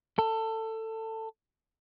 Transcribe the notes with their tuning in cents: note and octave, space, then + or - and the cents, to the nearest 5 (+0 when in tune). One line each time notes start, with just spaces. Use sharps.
A4 +20